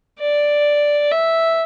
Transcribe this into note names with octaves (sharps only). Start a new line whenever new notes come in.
D5
E5